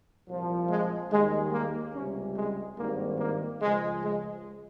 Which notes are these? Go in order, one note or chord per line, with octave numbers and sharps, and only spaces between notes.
C2 A#2 F3
G#3
D#2 D#3 G3 G#3
A#3
C#2 C3 G3 C#4
G#3
G#1 G2 D#3 G3 A#3
A#3
C#2 C#3 F3 G#3
G#3